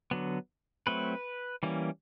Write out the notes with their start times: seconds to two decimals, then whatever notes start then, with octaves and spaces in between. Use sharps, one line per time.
0.11 D3 F#3 B3
0.87 F#3 A3 C4 B4
1.63 E3 G3 A#3 C#4